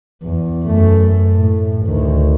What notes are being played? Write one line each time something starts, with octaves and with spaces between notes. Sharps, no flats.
E2
F#2 A3
A2
D2 D#3